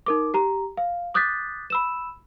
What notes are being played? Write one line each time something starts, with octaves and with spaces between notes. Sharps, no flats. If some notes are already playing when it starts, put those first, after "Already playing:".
D#4 A#4 D6
G4 A#5
F5
D6 D#6 F#6 G6 A6 B6
B5 E6 E7